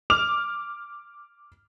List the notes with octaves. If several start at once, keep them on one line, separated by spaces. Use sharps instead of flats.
D6 F6 F7